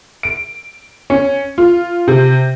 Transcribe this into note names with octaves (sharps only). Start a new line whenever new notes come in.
D7
C#4
F4
C3